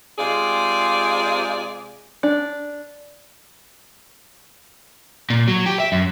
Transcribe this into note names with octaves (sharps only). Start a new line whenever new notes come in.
C3 G#3 F4 G#4 D5
D4
A#2
F#3
G4
E5
F#2